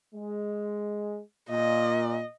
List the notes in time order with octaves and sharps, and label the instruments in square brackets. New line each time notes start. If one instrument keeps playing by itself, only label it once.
[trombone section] G#3
[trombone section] A#2 [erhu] D#5